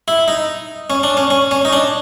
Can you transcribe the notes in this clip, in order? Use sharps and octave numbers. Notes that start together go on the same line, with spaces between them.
E4
D#4
C#4
D4
C#4
C#4
C#4
D#4
D4